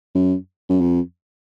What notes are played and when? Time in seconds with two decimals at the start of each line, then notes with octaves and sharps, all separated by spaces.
0.15 F#2
0.69 F#2
0.81 F2